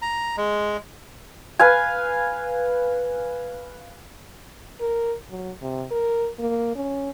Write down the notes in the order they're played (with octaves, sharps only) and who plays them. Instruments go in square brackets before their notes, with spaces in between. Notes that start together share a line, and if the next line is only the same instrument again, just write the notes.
[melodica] A#5
G#3
[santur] B4 F5 G#5
[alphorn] A#4
F#3
C3
A#4
A#3
C#4